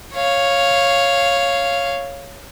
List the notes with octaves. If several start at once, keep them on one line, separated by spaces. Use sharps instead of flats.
C#5 F5